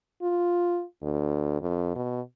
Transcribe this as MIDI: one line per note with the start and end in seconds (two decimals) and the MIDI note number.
0.22 0.84 65
1.02 1.57 38
1.62 1.94 41
1.96 2.21 47